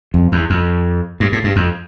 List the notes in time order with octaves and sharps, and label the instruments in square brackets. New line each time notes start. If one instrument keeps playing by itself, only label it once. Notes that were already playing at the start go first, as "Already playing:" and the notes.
[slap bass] F2
E2
F2
G2
A2
G2
F2